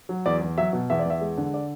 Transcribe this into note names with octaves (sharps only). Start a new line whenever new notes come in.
F#3
E2 D5
E2
F#3 E5
B2
E2 E5
D5
E2 E5
G#3
D3
D5